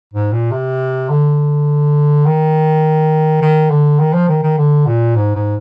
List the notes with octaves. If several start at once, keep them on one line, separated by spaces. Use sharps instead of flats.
G#2
A#2
C3
D3
D#3
D#3
D3
D#3
F3
D#3
D#3
D3
A#2
G#2
G#2